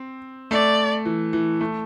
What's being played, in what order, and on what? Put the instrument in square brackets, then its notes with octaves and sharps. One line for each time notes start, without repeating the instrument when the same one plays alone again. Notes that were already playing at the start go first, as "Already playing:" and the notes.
Already playing: [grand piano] C4
[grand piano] A3 [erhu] D5
[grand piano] E3
E3
A3